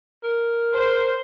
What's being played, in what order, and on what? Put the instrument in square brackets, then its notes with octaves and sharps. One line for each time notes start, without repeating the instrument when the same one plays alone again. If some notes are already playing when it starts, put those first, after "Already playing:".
[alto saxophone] A#4
[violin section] C5